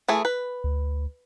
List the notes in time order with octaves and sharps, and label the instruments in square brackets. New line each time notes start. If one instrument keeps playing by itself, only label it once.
[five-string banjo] E3 A3 G#4
B4
[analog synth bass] D2